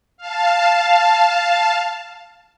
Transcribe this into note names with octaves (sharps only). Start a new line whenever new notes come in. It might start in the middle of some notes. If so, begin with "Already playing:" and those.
F5 A5